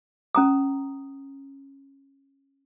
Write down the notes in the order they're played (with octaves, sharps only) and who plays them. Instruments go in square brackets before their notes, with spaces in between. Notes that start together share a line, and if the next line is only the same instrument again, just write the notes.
[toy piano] C#4 A#5 D#6